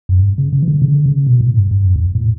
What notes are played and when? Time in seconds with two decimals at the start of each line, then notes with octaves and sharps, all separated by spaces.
0.09 F#2
0.19 G2
0.38 C#3
0.53 C#3
0.63 E3
0.68 D3
0.82 C#3
0.94 D3
1.06 C#3
1.27 B2
1.41 A2
1.56 G2
1.71 G2
1.85 F#2
1.96 E2
2.15 A2